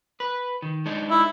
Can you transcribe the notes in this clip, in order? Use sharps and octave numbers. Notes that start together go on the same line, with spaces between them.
B4
D#3
G#3 D4 D#4
E4